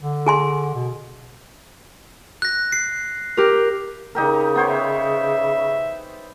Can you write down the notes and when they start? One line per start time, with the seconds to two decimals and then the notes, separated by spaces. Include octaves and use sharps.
0.01 D3
0.26 G#4 G#5 C6
0.75 B2
2.42 F#6 A#6
2.72 C7
3.37 G4 A#4
4.15 C#3 D#4 G4 A#4
4.56 B3 C5 C#5
4.70 E5